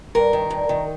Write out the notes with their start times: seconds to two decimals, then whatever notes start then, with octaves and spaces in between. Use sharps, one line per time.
0.15 G2 A#4
0.33 D#3
0.50 G2
0.69 D#3